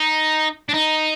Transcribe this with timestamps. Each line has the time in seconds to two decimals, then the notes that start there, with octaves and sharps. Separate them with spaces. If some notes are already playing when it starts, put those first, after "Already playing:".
Already playing: D#4
0.69 D4
0.74 D#4